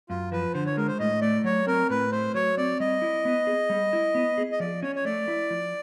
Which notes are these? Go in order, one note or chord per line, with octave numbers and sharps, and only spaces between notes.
F#2 F4
F3 B4
D3 C5
C#5
G#3 A#4
C5
A2 D#5
A3 D5
F#3 C#5
C4 A#4
A2 B4
A3 C5
F#3 C#5
C4 D5
G3 D#5
E4
B3
G#4
G3
E4
B3
G#4
D#5
F3 D5
C#4 C#5
C#5
A3 D5
E4
F3